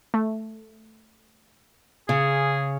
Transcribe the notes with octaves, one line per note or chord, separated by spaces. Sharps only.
A3
C#3 G#4